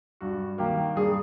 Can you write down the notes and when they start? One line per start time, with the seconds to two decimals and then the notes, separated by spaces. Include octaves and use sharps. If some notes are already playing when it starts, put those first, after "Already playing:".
0.21 G2 F#4
0.58 D#3 G3 A#3 G4
0.96 G2 G#4